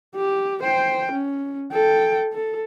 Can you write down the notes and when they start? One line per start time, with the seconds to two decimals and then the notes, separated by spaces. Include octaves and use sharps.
0.16 G4
0.63 C5 G5
1.11 C#4
1.72 A4 G5
2.33 A4